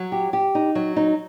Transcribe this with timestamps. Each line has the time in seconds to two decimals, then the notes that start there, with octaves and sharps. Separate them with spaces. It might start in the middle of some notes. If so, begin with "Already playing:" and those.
Already playing: F#3
0.12 G4
0.33 G4
0.55 D#4
0.75 F#3
0.96 D#4